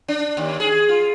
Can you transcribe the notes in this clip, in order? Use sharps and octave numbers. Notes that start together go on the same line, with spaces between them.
D4
D#2
G#4
F4